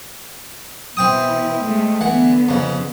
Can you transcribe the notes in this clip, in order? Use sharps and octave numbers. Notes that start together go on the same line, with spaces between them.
B2 E3 C4 E4 G5 D#6
G#3 A3
D3 E3 B3 F#5
F2 C#3